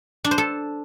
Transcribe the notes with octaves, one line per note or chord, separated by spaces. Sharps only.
D4
C5
A4